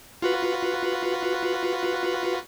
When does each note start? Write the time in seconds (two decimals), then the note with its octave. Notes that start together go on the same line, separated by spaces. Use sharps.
0.22 F4 F#4 B4